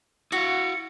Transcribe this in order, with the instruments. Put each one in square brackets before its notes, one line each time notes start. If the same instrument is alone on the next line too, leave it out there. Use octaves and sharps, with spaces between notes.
[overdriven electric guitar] E4 F5 [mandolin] F#4 [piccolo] C#7